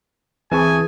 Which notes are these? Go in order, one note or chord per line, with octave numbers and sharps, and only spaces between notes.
D2 E3 C4 G#4 G#5 A5 C#6